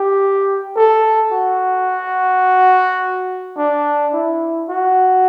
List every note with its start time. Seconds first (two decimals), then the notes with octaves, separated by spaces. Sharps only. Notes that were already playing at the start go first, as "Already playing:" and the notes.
Already playing: G4
0.76 A4
1.32 F#4
3.57 D4
4.14 E4
4.69 F#4